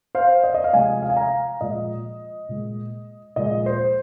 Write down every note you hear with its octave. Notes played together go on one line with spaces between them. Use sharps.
C5 F5
D#5
D#5
F5
C3 F3 G#3 D#5 G#5
F5
G#5
F5 A#5
A#2 F3 G#3 D#5
A#2 G#3
A#2 F3 G#3 D#5
C5